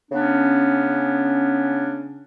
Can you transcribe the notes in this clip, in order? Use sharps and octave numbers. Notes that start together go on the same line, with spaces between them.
C#3 B3 C#4 D4